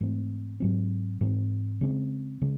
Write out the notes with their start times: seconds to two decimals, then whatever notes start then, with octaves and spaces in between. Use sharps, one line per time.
0.01 G#2 E3 A3 C4
0.60 G#2 F#3 C4
1.21 G#2 E3 C4
1.81 C#3 G#3 C4
2.42 C#3 G#3